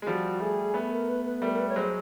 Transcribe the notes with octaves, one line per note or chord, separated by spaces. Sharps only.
G#3
F3 G3 F#4
G3 A3 G#4
A3 B3
A#4
B4
B4
G3 A3 A#4
A#4
B4
C#5
F#3 G#3 C5